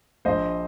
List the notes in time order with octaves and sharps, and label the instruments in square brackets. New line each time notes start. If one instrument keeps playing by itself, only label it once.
[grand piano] A#1 C5 D#5